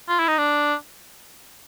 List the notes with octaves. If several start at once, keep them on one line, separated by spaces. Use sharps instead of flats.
F4
E4
D#4
D4